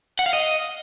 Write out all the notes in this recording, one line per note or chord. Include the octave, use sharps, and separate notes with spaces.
F#5
F5
D#5